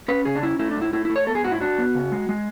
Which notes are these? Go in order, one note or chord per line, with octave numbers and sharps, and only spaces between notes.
C#4 B4
C#3 G#4
D4
C#4 E4
A3 E4
D4
G#2
E4
A3 E4
E4
A3
C#5
B3 A4
G#4
G#2 F#4
E4
D4 F#4
B3
C#3
G#3
G#3